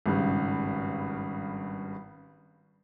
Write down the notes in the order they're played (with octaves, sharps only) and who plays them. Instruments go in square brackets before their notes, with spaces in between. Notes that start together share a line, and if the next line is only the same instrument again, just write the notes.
[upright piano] G#1 G2 C#3